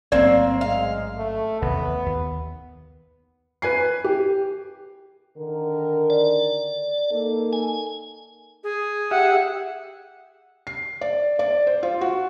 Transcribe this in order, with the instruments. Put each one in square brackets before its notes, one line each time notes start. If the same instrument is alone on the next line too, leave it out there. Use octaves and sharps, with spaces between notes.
[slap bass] A1 G#2 F#3 [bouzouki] A#3 C4 [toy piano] D5
[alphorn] G#3 [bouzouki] F5
[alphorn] A3
[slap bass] A1 D#2 C3 [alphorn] B3
[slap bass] D#2
[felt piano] B4 G#5 C7
G4
[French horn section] D3 D#3 A#4
[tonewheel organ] D5
[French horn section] A#3 D#4 A4
[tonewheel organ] G#5
[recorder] G#4
[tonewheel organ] G4 E5 [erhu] F#5
[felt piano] C7
D5
D5
C5
F4
F#4